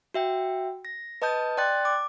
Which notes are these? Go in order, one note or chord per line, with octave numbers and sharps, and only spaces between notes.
F#4 E5 G5
A#6
B4 D#5 A5 D#6 G6
D5 G5 C6 F#6 A6
D6